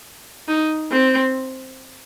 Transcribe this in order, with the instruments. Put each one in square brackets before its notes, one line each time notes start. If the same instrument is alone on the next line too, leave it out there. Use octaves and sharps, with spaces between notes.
[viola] D#4
C4